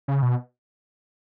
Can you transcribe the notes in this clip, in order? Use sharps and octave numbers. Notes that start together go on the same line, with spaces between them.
C#3
B2